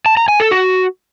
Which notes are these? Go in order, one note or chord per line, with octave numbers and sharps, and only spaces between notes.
A5
A#5
G#5
A4
F#4